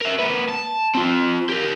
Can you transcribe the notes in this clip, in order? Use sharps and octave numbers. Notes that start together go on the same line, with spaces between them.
A#4 E5
A#3 B4
A5
C4 F4
G4 A#4